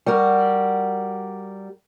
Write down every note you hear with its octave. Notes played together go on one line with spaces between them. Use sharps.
G3 F#4 A#4